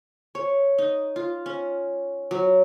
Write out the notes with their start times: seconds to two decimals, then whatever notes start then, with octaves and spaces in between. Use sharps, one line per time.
0.35 C#5
0.78 D#4
1.16 F4
1.46 C#4
2.31 F#3